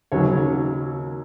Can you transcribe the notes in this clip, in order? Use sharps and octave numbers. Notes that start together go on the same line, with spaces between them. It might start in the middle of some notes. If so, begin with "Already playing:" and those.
D#2 C#3 F#3 C#5